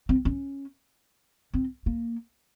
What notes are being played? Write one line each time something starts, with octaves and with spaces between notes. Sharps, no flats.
C4
C#4
C4
A#3